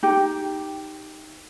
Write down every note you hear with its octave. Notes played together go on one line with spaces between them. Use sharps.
D#4 G4